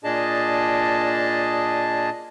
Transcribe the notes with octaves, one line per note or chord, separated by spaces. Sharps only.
A#2 D4 G#4 D#5 A5